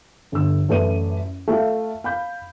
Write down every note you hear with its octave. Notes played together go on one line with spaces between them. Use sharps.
G1 D3 E6
A1 F#2 A3 B4 D5 D#7
A3 F4 F5
F5 B5 G6